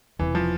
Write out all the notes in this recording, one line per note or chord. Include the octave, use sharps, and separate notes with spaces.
E1 E2 C3 E3
F3